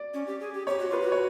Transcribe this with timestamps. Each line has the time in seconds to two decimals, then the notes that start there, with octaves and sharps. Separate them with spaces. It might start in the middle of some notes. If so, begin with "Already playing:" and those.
Already playing: D5
0.14 C#4
0.27 G4
0.40 G#4
0.54 G4
0.67 G4 C#5
0.79 F#4
0.90 F4 B4
1.02 F#4
1.12 C#5